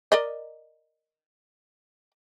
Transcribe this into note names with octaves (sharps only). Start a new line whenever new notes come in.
A#4 D5 D#5